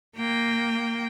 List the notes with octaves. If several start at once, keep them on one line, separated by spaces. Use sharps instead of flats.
A#3 G5